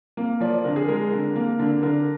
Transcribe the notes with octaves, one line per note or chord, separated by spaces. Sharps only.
A#3
F3 D5
D5
D3 A#4
G#4
G#3 A#4
D3
A#3
D3
D3 A#4